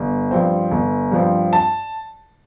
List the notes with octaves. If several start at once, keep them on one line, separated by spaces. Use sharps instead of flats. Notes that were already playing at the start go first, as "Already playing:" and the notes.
Already playing: G1
G2 F3 C4
G1
G2 F3 C4
A5